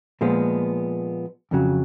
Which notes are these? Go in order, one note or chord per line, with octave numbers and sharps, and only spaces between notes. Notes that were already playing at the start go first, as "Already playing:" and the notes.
A#2 F3 G#3 B3
F2 C#3 F#3